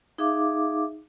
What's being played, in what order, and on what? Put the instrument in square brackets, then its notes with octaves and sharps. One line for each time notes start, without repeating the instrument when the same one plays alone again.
[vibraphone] D#4 G#4 E5 F5 D6